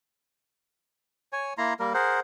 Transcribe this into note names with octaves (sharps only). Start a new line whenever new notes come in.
C#5 G#5
A#3 E4 A#5 C6
G3 A#3 A#4
G#4 A#4 C5 F#5